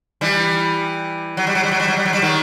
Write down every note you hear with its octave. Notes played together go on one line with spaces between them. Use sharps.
E3 G3
F#3
G3
F#3
G3
F#3
G3
F#3
G3
F#3
G3
D#3 F#3